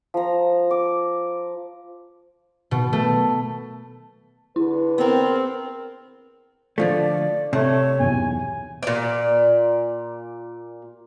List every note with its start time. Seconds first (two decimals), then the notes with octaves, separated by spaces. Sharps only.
0.14 F3 A#5
0.71 D6
2.71 B2
2.93 A3
4.56 D3 E4 G#4 B4
4.98 B3 C4 A#4
6.78 D3 F3 A3 D5
7.53 C3 A3 C#5
8.00 B1 E2 G#5
8.83 A#2 D5